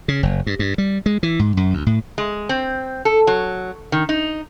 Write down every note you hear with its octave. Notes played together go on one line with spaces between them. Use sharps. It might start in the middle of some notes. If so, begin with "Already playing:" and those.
C#3
F#1
G2
G2
G3
G#3
E3
G#2
F#2
D2
A2
G#3
C4
A4
F#3
D#3
D#4